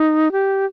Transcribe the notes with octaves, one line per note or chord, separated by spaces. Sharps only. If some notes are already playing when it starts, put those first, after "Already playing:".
Already playing: D#4
G4